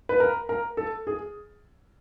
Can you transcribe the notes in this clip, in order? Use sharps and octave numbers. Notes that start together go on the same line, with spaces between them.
B4
A#4
A#4
A4
G#4